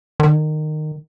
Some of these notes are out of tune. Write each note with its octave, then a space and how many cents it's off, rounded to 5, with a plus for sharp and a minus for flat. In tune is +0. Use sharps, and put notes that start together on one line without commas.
D#3 -20